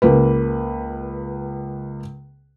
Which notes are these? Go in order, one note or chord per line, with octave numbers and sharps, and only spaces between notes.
C#2 A#3 B4